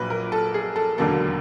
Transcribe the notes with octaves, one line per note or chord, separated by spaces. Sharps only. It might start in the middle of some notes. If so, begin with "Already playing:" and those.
Already playing: A#1 A#2 F#3 B4
A#4
A4
G#4
A4
E1 D#2 D3 F#3 A#3 A4